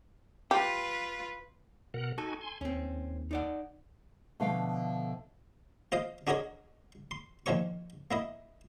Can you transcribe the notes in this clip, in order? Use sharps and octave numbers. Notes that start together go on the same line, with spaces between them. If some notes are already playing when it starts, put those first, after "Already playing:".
F4 G4 B4
B2 A#4 F#5
D#4 F#4 A4 G#5
G#5 C6
D#2 C4 C#4
D#4 D5 F#5
B2 D3 F3 A3 F5 G5
F4 C5 D#5 F5
D4 F#4 G#4 A#4 C#5 D#5
C6
A#2 D#3 F3 C#5 C#6
A#3 E4 D#5